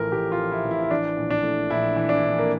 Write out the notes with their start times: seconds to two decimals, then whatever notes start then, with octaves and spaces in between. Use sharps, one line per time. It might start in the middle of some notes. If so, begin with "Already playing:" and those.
Already playing: A1 A2 F3 A#4
0.12 A1 G4
0.32 F4
0.38 F3
0.52 E4
0.65 A1
0.71 E4
0.82 E4
0.91 E3 D4
1.17 A#1
1.31 D4
1.43 A2
1.70 A#1 E4
1.96 E3
2.09 D4
2.23 A#1
2.39 A#3